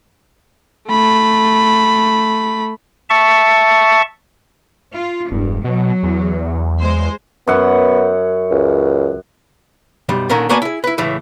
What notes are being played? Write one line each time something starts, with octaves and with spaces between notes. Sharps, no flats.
A3 B5
E5 A5 C#6
F4
E1 G2
B2 F#3
E2
G#3 C5
F#2 B3 F#5
C#2
B1 F#2 G3
A#2 D3 D#3 C#4 A#4
A#3 B3 F#4 D5 G#5 A5
E4 G#4
E4 B4
C#2 A2 E3 A3